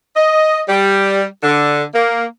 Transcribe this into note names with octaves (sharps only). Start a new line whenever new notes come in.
D#5
G3
D3
A#3